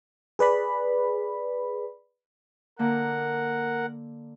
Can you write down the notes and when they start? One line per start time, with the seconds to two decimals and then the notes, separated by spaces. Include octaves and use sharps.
0.39 G#4 B4 D5 B5
2.79 D3 A#3 A#4 F#5